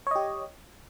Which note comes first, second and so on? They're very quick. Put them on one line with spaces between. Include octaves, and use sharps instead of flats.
C#5 D#5 G4